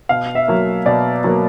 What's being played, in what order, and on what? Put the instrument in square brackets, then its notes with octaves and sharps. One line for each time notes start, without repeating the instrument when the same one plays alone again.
[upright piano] B2 F5
E5
F#3 A#3
B2 D5
F#3 A#3